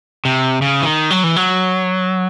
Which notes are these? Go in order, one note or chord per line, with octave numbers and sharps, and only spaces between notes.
C3
C#3
E3
D#3
F#3
E3
F#3